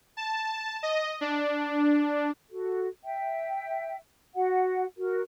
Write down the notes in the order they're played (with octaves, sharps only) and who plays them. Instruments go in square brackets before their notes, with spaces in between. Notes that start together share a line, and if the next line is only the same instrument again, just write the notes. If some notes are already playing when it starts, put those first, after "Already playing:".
[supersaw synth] A5
D#5
D4
[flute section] F#4 A4
E5 G5
F#4 F#5
F#4 A#4